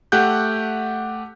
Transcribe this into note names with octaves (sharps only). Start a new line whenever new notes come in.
A3 G4 F#5 F#6 G6